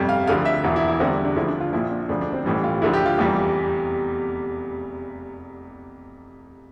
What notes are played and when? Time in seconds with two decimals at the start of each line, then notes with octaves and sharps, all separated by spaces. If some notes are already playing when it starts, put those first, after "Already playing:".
Already playing: G1 F2 C3 G3
0.09 F5
0.27 D2 D3 F3 F5
0.45 E5
0.64 E1 E2 E3
0.76 E4
0.88 E4
1.00 E2 D3 G3 C4
1.25 D4
1.36 D2 D3 F3 E4
1.48 D4
1.61 F4
1.73 A#1 A#2 F3 E4
1.91 D4
2.09 E1 D2 D3 F3 D4
2.21 D4
2.33 C4
2.45 A1 A2 E3 G3
2.64 F4
2.82 D2 D3 F3 E4
2.93 G4
3.06 F4
3.18 F1 E2 E3 G3